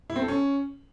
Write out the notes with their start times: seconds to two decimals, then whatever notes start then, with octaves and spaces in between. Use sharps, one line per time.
0.10 E4
0.16 C4
0.22 A4
0.28 C#4